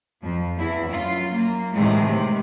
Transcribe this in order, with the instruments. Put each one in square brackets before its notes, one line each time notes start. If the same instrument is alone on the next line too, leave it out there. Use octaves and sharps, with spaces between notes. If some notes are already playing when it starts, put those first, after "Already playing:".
[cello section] F2 F3
E2 E4
F#2 F4
A#3
A2 C3 D#3 E3 G#3 A3
C3